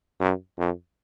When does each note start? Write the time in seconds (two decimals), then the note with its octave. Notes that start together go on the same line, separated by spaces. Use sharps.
0.20 F#2
0.58 F2